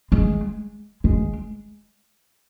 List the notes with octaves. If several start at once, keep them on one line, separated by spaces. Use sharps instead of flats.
G#3
G#3